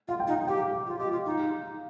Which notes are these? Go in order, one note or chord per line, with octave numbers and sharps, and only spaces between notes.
F4 F5
G5
D#4
F5
G4 G5
F5
F4
G4 D#5
F4
D#4 F5